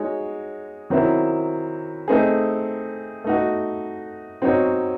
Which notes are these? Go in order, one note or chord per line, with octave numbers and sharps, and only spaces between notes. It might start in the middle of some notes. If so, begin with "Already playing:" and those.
Already playing: G#3 D#4 F#4 C#5
D#3 F#3 C4 E4
A3 C4 D#4 G#4
A3 D#4 F#4
F#3 C4 D#4 F#4 C#5